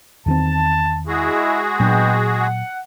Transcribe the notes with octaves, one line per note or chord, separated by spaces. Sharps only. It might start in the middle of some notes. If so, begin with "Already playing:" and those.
E2 D#3 C4 A5
G#3 E4 F#4 G#4
A#2 F#3 B3 D4 G5
F#5